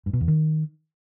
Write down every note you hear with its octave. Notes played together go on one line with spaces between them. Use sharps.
G2
B2
E2
D#3